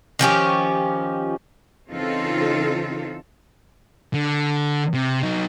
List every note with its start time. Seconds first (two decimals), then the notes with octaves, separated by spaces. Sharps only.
0.19 D#3 F3 C#4 G4
1.91 C#3 E3 C4 D#4 F4 A4
4.14 D3
4.94 C3
5.23 F#3 D#4